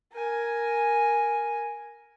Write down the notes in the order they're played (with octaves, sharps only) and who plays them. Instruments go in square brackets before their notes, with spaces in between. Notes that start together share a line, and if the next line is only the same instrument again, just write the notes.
[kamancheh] A#4 G#5